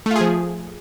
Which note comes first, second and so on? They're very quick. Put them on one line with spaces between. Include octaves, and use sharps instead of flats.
A3 F4 G#4 F3